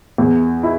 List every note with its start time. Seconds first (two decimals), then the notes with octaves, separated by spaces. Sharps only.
0.18 E2
0.63 E4